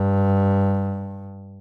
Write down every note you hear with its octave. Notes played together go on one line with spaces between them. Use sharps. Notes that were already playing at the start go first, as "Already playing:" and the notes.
Already playing: G2